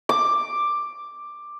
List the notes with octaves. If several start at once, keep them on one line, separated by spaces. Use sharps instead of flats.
D6